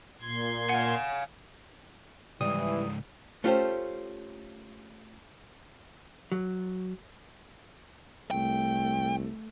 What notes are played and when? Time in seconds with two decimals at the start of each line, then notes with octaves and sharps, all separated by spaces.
0.21 A#2 C6 G#6
0.69 F5 F#5 G#5
2.41 C#2 G#2 E3 G3 D#6
3.44 A3 C#4 F4 G4 A4 C5
6.32 F#3
8.31 C2 A3 G5